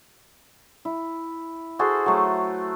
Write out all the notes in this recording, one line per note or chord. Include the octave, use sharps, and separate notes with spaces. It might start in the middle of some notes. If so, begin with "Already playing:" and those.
E4
F#4 G#4 A4 C5
F#3 A3